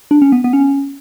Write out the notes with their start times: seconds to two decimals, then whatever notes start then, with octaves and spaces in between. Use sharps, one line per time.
0.11 D4
0.22 C#4
0.32 B3
0.44 B3
0.53 C#4